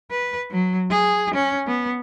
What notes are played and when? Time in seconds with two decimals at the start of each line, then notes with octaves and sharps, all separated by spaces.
0.11 B4
0.51 F#3
0.91 G#4
1.35 C#4
1.67 B3